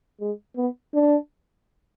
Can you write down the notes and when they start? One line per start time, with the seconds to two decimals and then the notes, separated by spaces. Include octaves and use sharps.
0.20 G#3
0.56 B3
0.94 D4